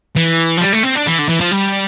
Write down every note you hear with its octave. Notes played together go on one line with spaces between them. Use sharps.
E3
F3
G3
A3
C4
D4
E3
D3
E3
F3
G3